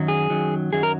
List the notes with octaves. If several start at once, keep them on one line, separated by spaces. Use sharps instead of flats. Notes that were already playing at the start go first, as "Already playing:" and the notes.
Already playing: F#2 D#3 F#3
G#4
F#2 D#3 F#3
F#2 D#3 F#3 G#4
A#4